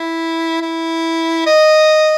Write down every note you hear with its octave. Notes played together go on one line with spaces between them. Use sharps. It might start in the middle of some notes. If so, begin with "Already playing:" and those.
Already playing: E4
E4
D#5